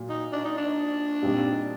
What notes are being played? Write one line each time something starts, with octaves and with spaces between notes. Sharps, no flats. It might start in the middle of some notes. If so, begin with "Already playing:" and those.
Already playing: A#2 F#3
D#4
D4
D#4
D4
A#2 G3 C4 D#4